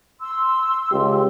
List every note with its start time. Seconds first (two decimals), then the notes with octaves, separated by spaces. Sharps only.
0.21 C6 E6
0.92 C#2 G4